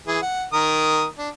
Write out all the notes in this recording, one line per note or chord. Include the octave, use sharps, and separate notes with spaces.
E3 G#4
F#5
D#3 A#4 D#6
D4